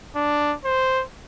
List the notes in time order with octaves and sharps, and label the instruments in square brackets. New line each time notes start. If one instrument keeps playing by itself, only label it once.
[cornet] D4
C5